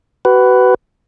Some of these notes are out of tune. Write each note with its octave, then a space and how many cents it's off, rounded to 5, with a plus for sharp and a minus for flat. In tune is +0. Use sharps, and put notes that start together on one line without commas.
F#4 +35 B4 +10